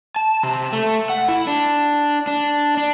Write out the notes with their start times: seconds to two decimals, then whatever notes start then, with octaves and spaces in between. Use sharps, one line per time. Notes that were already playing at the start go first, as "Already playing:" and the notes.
0.16 A5
0.43 C3
0.73 A3
1.10 F#5
1.28 E4
1.47 D4
2.27 D4
2.77 D4